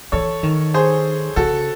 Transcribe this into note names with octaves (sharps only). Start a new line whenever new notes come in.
E3 A4 C#5
D#3
G#4 C5
C#3 F#4 A4